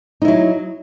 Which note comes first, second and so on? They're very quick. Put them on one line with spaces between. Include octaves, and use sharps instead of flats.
D#4 E4 F#3